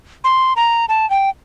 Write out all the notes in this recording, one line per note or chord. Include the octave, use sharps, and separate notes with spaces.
C6
A#5
A5
G5